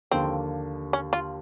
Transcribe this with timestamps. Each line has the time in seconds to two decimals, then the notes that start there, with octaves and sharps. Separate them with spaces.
0.11 D#2 D3 F3 A#3 C4
0.93 C#4
1.13 F4